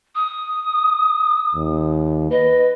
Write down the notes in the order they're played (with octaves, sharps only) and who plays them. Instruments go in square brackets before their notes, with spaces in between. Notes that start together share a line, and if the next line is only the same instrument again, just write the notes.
[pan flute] D#6
[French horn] D#2
[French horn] B4 [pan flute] D#5